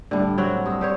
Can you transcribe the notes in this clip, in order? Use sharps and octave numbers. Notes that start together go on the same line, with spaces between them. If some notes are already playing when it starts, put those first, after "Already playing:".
A2 D3 G3
F#3 C4 F#4
G2 D#6 E6
G3 C5 C#5